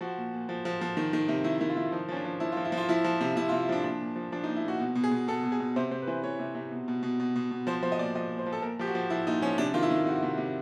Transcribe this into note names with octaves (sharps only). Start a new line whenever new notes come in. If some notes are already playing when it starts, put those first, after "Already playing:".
F3 F#4
A#2
A#2
F3
F3
F3
D#3
D#3
C3
D#3 E4
D#3 E4
F4
D#3 E4
F3 D#4
F3 C#4
D4
F3
F3 E4
F3 F4
E4
F3
F4
F3 E4
F3
C3
C3 E4
F4
C3
F3 D4
A#2 D4
A#2
F3
F3 D4
D#4
A#2
E4
A#2 F#4
B2
B2
G#4
B2
B2 A4
B2
G#4
B2
C3 C5
C3 C5
B4
E3 C5
E3 C#5
C3
C3
B2
B2
B2
B2
B2
B2
F3 C5
F3 C5
D#5
A#2 D5
F3 D#5
A#2
C5
F3
A4
A#2 A#4
F3 G4
F#4
F3
F3 E4
A#2 D#4
F3 C#4
C3 D4
D#3 F4
E4
D#3
C3 F#4
C3
C3